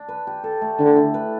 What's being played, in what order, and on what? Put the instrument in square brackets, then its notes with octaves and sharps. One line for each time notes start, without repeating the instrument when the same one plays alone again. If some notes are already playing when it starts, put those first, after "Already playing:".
Already playing: [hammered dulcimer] D4
B4
G4
A4
A3
[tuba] D3 [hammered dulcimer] E4
[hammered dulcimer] E4
B4